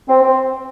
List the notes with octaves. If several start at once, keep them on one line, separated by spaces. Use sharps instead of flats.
C4
C4